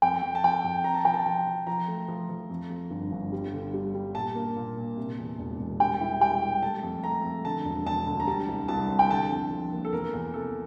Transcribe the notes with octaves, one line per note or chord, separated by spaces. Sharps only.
F2 G5
F2
A5
F2 G5
F2
C4 A#5
A5
F3 G5
A5
F3
F3
F3 A#5
A3
F3
F3
F2
F2
G1
G1
G3
D3
G3
G3
A#2 A5
A#3
A#2
A#2
C3
E2
E1
E1
G3 G5
E4
G3 G5
G3
A3 A5
F2
A3 A#5
F2
D3 A5
E1
E1 A5
D2
A#5
G3 A5
C2
C2 A5
C4
G5
D3 A5
F2
F3
A#3
A4
E2 A#4
E2
C3 A4